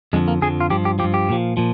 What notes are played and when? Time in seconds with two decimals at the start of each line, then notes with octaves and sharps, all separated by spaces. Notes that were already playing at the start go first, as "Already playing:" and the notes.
0.13 F2 D3 F3 G#3
0.28 A#3
0.42 F2 D3 F3 G#4
0.60 F4
0.70 G2 F3 G4
0.85 G4
0.99 F3 G4
1.04 G2
1.14 G4
1.29 A#2 F3
1.57 A#2 F3